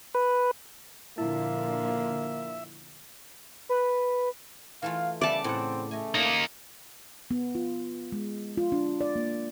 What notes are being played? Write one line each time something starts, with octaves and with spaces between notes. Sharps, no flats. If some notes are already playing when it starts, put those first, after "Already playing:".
B4
A#2 D3 F3 A#3 E4 E5
B4
E3 A3 F4 F5
C#3 G3 B3 D5 E5 A5
A2 C4 F#5
A3 D#5 G#5
A#3 D#4 D#5
B3
F4
G#3
F4
D4
D5
A#3